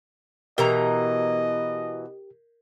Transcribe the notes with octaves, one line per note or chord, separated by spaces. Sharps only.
B2 E3 G4 A#4 D#5 A#5